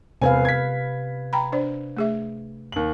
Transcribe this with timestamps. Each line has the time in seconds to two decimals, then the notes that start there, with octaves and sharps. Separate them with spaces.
0.22 E1 C3 C4 B4 F5 G#5
0.45 G#6 B6
1.33 G5 A#5 B5
1.52 D4 C5 D5
1.97 A3 G#4 E5
2.72 D#2 F#7